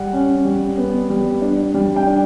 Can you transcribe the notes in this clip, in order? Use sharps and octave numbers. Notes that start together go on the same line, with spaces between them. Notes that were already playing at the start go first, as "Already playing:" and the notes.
Already playing: G3 F#5
C#4
G3
B3
G3
D4
G3
G5
D4